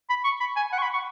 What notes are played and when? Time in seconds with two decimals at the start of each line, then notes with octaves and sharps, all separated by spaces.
0.10 B5
0.24 C#6
0.40 B5
0.56 G#5
0.72 F#5
0.79 C#6
0.82 B5
0.93 C#6